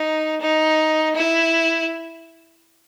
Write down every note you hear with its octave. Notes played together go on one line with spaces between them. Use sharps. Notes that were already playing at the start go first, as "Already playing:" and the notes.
Already playing: D#4
D#4
E4